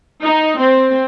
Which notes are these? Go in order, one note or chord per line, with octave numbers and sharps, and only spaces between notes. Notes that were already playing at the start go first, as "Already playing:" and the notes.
D#4
C4